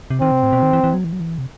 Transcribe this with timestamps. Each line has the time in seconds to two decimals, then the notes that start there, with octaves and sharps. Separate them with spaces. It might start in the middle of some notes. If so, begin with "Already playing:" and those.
0.10 C3
0.21 D#3 C4
0.31 C3
0.43 A2
0.53 B2
0.62 D#3
0.73 E3
0.84 E3
0.94 F#3
1.04 E3
1.12 F#3
1.20 E3
1.38 C3